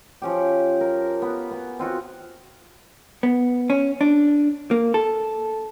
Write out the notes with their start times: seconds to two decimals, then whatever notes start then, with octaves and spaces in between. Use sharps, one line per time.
0.22 F3 C#4 G4
0.81 A#4
1.22 B3
1.51 B3
1.79 C4 F4 F#4
3.23 B3
3.70 C#4
4.01 D4
4.71 A#3
4.94 A4